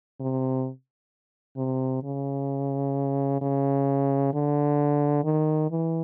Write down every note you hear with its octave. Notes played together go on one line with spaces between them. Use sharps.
C3
C3
C#3
C#3
D3
D#3
E3